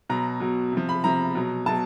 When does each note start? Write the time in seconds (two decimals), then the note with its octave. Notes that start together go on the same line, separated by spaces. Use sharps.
0.10 B2 F#3 A#5
0.40 B2 F#3
0.72 C3
0.77 F3
0.89 B5
1.03 C3 F3 A#5
1.35 B2 F#3
1.66 B2 F#3 A5